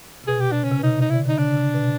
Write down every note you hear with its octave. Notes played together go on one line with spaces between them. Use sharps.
C3
B2 G#4
G4
D4
C#3 C#4
C3
B2
C3 D#4
C3 D#4
D3 E4
D3 D#4
C#3 D4
C3
B2